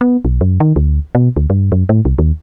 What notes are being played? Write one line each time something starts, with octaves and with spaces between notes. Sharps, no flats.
B3
B1
F#2
D#3
D2
B2
D2
G2
F#2
A2
C2
D#2